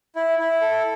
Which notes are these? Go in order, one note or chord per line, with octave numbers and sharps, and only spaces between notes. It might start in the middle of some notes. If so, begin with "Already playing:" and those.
E4
E4
A4